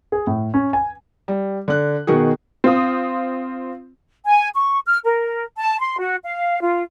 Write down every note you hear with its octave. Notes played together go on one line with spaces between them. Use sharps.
G#4
A2
C#4
G#5
G3
D3 F#6
B2 D#3 F#4 G#4
C4 F4 D#6
G#5
C#6
F6
A#4
A5
C6
F#4
F5
F4